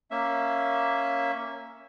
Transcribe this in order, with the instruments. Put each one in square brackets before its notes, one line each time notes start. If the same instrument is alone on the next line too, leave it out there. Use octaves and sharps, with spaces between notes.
[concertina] A#3 C#4 E5